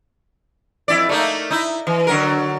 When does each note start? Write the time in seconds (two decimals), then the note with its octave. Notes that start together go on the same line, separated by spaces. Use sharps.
0.88 F2 E4 D5
1.09 A3 A#3 D#4
1.50 D#4 E4
1.87 E3
2.07 D3 F#3 A#4